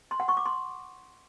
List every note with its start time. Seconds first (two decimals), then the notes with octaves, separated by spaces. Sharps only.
0.11 C6
0.20 F#5
0.28 C#6
0.37 D6
0.45 C6